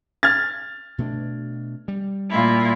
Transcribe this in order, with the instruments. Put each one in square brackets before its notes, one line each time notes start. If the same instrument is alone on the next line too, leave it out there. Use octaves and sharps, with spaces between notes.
[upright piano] F6 G#6 A6
[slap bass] B2 A3 D4
G3
[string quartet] A#2 E4 F4